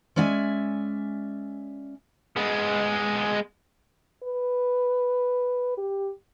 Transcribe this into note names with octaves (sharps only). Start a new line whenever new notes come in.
G#3 C#4 D5 E5 G5 G#5
G#3 B3
B4
G4